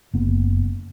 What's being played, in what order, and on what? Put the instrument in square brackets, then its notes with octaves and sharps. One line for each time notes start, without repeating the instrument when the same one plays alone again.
[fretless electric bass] F#1 B3